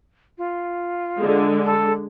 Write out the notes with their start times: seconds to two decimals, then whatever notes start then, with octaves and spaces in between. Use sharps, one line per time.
0.38 F4
1.18 D3 G#3
1.65 A4